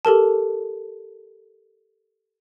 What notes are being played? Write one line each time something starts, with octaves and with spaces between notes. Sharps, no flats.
G4 A4 A#4 A5